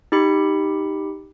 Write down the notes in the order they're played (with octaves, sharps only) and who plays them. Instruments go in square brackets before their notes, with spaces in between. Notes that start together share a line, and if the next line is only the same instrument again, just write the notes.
[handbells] D#4 G4 B5 C#7